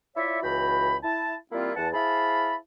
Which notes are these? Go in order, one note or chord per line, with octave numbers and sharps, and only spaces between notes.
E4 F4 C#5 D5 E5
C#2 E3 F#4 G5 B5
E4 A5
G3 A#3 C4 E4 F4
E2 F#5 A5
E4 G#4 C5 F5 A5 B5